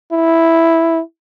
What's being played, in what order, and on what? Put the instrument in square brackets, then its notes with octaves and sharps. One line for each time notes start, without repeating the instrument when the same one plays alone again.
[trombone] E4